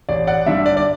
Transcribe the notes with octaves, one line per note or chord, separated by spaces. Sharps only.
A1 D5
D5 F#5
G2 D3 G3 D4 E5
D5
D5